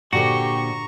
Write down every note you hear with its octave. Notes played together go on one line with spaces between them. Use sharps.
A#2 D3 F#4 G4 C5 A#5 C#6